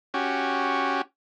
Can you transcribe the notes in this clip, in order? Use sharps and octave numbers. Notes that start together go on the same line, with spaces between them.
C#4 F#4 G4